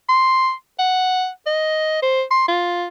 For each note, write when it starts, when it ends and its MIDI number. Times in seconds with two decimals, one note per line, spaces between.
0.09 0.51 84
0.79 1.28 78
1.46 1.99 75
2.02 2.22 72
2.31 2.46 84
2.48 2.86 65